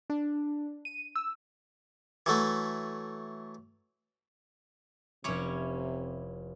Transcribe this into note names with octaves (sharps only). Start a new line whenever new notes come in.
D4
D#7
E6
E3 F#3 A3
F1 C3 C#4 E4 C#5 D6